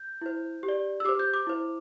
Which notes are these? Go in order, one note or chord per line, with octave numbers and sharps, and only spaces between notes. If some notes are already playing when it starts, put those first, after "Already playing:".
Already playing: G6
E4 C5
G4
D5
E6
G4 C5 D6
G6
D6
E4 C5